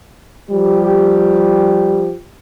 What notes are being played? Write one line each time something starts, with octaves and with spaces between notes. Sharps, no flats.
F3 G3 G4